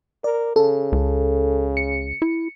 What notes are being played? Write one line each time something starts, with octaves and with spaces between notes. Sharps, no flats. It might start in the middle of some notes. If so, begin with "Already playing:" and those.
A#4 D5
C#3 A4
C#2
C#7
E4